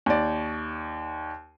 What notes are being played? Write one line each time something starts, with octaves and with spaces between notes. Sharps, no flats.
D#2 D5